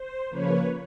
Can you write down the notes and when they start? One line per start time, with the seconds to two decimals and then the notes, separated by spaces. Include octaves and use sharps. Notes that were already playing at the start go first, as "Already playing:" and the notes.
Already playing: C5
0.29 C#3 F3 A#3 B4 C#5